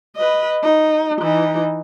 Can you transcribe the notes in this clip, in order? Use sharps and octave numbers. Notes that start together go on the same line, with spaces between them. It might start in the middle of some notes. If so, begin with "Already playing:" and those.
B4 D#5
D#4
E3 D#4